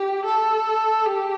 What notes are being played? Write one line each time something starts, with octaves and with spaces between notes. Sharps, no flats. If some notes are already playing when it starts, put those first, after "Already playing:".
Already playing: G4
A4
G4